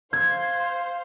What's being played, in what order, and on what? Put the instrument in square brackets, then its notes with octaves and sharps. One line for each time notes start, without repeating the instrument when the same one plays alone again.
[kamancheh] C5 F5 [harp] G#6